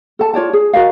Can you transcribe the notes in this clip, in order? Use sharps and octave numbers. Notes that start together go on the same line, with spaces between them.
A4 A5
F4 C#5 D5 A5
G#4
F#4 A#4 D#5 F5